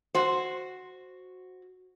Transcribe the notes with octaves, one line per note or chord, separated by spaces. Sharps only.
F#4 C5